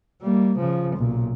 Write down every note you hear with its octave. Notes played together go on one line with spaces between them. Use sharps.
G3 A#3
C#3 F3
B1 A#2